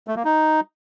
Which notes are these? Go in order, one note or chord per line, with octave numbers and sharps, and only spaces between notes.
A3
A#3
D#4